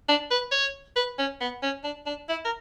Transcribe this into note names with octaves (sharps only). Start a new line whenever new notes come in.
D4
B4
C#5
B4
C#4
B3
C#4
D4
D4
E4
A#4